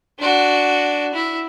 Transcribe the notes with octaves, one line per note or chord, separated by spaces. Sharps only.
D4 F#4
E4